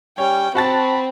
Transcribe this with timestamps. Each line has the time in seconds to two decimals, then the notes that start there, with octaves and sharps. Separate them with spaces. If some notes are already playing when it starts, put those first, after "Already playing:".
0.18 G3 C#4 C#5 G5
0.55 C4 F#4 A5 B5 A6